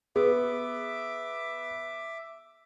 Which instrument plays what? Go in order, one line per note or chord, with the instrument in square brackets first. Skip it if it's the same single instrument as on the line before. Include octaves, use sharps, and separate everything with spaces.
[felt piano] B3 [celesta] G#4 [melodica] E5 D6